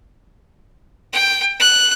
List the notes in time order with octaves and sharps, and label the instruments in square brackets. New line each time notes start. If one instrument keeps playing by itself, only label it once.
[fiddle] G5
F#6